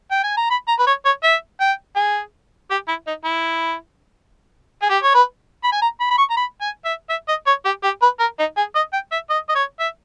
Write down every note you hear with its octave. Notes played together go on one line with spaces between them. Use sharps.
G5
G#5
A#5
B5
A#5
B4
C#5
C#5
E5
G5
G#4
G4
E4
D#4
E4
G#4
G4
C#5
B4
B5
G#5
A#5
B5
B5
C#6
A#5
B5
G#5
E5
E5
D#5
C#5
G4
G4
B4
A#4
D#4
G#4
D#5
G5
E5
D#5
D#5
C#5
E5